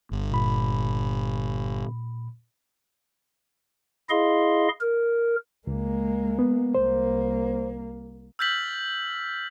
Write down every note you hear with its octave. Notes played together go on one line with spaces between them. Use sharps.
G1
A#2 B5
E4 G#4 D#5 F5 C6
A#4
C#2 G#3 A#3
B3
C2 A#3 C5
E6 F6 G6 A6 B6 F#7